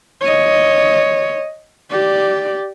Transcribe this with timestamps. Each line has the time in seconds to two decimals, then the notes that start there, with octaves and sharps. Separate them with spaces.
0.21 C#5 D#5
1.91 G4 D5